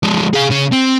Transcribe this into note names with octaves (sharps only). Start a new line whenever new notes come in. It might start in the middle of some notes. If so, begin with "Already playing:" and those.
F3 G#3
G#4 F5
C#3 C#4
C4